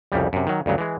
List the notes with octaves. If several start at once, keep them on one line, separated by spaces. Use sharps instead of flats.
C2 F2 C#3 G3
F#2 C3
D#3 F#3
D2 G2 C#3 F#3
E3 G#3